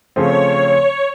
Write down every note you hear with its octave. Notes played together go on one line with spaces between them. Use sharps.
C#3 F3 A3 C4 C#5